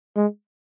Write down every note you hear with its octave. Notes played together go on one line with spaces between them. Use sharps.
G#3